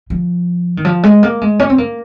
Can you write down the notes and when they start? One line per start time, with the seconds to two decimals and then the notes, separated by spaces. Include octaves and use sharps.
0.10 F3
0.77 D#3
0.85 F3
1.03 G#3
1.23 A#3
1.41 G#3
1.60 C#4
1.70 C4
1.78 A#3